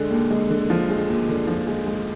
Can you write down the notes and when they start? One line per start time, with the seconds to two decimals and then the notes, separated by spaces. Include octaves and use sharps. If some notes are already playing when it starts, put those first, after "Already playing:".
Already playing: D3 G#3
0.10 D#2
0.31 G#3
0.50 D3
0.70 F3
0.89 G#3
1.09 D#2
1.29 D3
1.47 F3
1.67 G#3
1.87 G#3